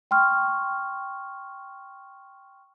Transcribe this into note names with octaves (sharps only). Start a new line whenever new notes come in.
G5 C6 C#6 F6